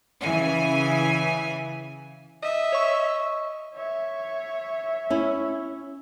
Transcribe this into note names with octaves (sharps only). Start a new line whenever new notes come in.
C#3 E3 G#5
D#5 E5
C#5 C#6 E6
C#5 E5
C#4 E4